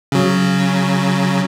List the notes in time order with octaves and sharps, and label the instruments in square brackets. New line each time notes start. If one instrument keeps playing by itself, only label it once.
[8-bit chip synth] C#3 F#3